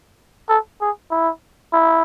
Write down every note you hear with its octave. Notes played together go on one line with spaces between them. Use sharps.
A4
G#4
E4
E4